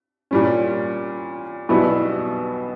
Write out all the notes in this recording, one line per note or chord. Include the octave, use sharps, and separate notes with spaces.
A#2 G3 C#4
B1 B2 G3 B3 E4